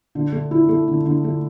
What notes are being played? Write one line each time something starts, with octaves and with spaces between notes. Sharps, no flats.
D3
A3
E4
A3
D3
D3
A3